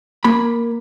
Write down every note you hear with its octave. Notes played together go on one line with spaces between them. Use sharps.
A#3 B5